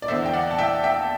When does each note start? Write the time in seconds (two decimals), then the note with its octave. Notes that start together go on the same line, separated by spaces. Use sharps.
0.02 D5
0.08 E2 D3 C5 E5
0.26 G5
0.34 D5 F#5
0.51 A5
0.58 E5 G5
0.84 E5 G5